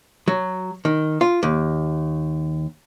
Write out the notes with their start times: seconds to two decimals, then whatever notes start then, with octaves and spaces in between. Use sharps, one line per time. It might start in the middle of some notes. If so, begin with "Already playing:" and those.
0.28 F#3
0.85 D#3
1.21 F4
1.43 D#2